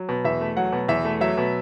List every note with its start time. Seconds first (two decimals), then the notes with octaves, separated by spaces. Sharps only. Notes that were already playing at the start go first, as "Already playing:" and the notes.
Already playing: F#3
0.09 B2
0.25 E2 E5
0.41 A3
0.57 F#3 F#5
0.73 B2
0.89 E2 E5
1.05 A3
1.21 F#3 E5
1.38 B2